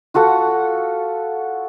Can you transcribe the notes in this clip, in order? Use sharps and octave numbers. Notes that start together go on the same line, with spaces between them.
F4 F#4 A4 F#5